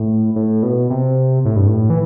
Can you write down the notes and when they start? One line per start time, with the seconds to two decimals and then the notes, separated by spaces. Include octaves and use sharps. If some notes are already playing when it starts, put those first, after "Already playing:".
Already playing: A2
0.36 A2
0.63 B2
0.90 C3
1.45 A2
1.56 G2
1.68 A2
1.90 E3